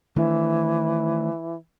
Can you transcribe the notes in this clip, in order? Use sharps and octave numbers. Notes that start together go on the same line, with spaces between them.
D#3 E3 A3 D4